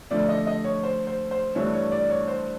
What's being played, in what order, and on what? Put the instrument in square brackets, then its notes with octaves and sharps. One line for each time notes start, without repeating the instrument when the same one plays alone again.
[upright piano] D3 F3 A3 D5
D#5
D#5
C#5
C5
C5
C5
G2 E3 A3 D4 C#5
C#5
D5
C#5
C5